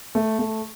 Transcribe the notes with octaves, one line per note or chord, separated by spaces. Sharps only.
A3
A3